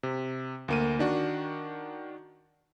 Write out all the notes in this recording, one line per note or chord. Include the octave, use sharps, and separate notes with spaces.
C3
D2 A#3 D#7
D#3 D4 F#4